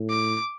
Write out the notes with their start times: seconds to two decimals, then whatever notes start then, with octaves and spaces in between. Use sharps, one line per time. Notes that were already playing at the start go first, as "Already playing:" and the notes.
Already playing: A2
0.10 D6